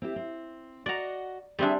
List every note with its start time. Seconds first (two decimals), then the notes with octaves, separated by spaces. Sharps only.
0.02 C4 E4 G4
0.16 C4
0.86 F#4 D5 D#5 F#5 A#5
1.59 G3 C4 D4 G4 G#4 E5